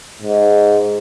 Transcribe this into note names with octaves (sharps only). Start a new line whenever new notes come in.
G#2